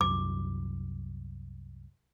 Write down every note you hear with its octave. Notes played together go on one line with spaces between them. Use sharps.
C2 F#2 D6